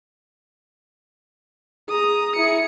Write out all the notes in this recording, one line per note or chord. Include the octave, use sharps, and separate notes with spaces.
G#4 A#5 D#6
E4 G#4 C#7